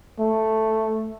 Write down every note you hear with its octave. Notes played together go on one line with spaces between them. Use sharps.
A3